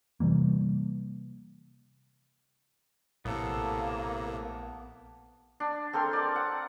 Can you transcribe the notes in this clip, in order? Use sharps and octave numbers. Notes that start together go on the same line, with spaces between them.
C3 E3 G3 A#3
A#1 A2 C3 A#3 B3 A4
D4
C4 A4 A#4 C6
D5 D6
F#5